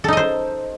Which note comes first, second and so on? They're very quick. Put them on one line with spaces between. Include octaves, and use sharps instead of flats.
A4 D#4 D#5 C5